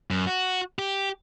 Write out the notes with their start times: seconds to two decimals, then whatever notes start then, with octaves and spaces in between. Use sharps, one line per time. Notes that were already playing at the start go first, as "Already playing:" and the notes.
0.10 F#2
0.27 F#4
0.79 G4